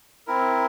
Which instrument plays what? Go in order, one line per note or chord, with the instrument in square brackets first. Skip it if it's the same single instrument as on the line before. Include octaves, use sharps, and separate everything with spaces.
[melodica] C4 E4 A#4